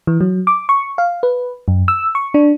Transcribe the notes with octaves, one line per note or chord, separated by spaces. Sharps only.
E3
F#3
D6
C#6
F5
B4
F#2
E6
C#6
D4